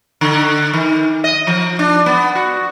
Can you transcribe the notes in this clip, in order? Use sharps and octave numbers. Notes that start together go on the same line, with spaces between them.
D3
D#3
D#5
F3
D4
B3
F#4